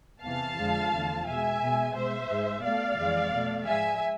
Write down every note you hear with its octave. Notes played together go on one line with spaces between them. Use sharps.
E2 C3 E3 F5 A5
F2 D3 F3 G#3
E2 D3 F3 A3
B2 G#3 E5 G#5
B2 G#3
B2 G#3 C5 E5
G#2 G#3
B2 A3 D5 F5
F2 E3 G#3
B2 A3
G#2 F3 G#3 E5 G#5